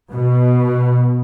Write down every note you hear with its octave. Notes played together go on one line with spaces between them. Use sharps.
B2